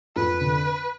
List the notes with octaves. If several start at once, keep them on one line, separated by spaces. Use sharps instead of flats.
F2 B4
D3